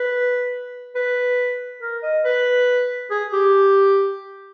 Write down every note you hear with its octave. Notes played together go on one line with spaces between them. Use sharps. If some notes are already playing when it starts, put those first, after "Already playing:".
Already playing: B4
B4
A#4
D#5
B4
G#4
G4